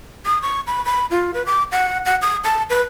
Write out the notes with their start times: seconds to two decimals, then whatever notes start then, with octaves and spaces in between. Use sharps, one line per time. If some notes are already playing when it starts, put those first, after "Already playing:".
0.26 D#6
0.42 C#6
0.67 B5
0.85 B5
1.11 F4
1.34 B4
1.46 D6
1.72 F#5
2.06 F#5
2.22 D#6
2.44 A5
2.70 B4